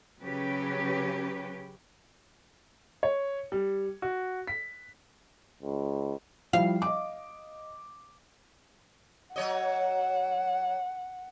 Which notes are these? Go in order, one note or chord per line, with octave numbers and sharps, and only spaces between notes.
C#3 F#3 C#4 G4 B4
C#5
G3
F#4
B6
C#2
F3 G3 E4 F5
D#5 D6
F#3 C#5 D#5 F#5